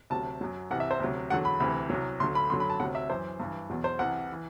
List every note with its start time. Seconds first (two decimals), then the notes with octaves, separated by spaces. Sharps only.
0.10 D2 C3 F#3 A5
0.41 F#2 F#3
0.70 C2 C3 E3 F#5
0.80 E5
0.91 C5
1.00 D2 C3 F#3
1.30 E2 D3 F#3 F#5
1.45 B5
1.60 D2 C3 E3 B5
1.90 C2 C3 F#3
2.20 D2 D3 F#3 C6
2.35 B5
2.50 F#2 D3 F#3 C6
2.60 B5
2.70 A5
2.80 D2 C3 F#3 F#5
2.95 E5
3.10 F#2 E3 C5
3.40 G2 E3
3.70 E2 B2 F#3
3.84 C5
3.99 C2 C3 E3 F#5
4.32 E3